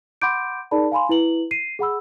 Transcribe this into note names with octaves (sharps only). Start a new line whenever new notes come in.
F#5 B5 C6 D6 G6 D7
D#4 G#4 A#4 D5 A5 B5
F5 G#5 B5 C6
E4 B4 F#7
C7 D#7
G#4 F#5 B5 E6